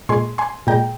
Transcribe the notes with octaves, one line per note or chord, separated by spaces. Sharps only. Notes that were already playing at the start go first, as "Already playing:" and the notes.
A#2 G#3 G#5 C6
G#5 C6
A#2 G#3 G5 A#5